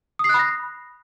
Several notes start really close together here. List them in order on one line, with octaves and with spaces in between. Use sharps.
D#6 C7 F#6 B5 A#6